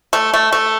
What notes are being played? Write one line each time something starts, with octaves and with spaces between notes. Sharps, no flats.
A3
A3
A3